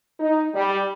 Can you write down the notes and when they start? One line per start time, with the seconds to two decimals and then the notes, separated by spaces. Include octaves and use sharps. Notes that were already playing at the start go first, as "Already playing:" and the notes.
0.19 D#4
0.54 G3